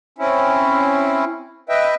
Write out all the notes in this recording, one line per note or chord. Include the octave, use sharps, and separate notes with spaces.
C4 C#4 E4
B4 D#5 E5 G5